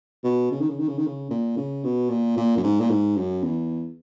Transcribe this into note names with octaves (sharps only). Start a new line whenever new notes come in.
B2
C#3
D#3
C#3
D#3
C#3
D#3
C#3
A#2
C#3
B2
A#2
A#2
F#2
G#2
A#2
G#2
F#2
E2